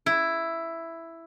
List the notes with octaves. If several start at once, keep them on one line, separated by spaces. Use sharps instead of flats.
E4